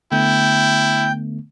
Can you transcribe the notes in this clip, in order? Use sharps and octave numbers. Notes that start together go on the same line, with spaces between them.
D3 A3 B3 E4 G5